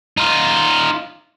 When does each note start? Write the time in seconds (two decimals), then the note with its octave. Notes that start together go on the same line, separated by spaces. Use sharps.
0.17 D#4 F4